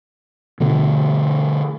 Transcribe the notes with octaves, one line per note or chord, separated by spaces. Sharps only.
B2 D3 A3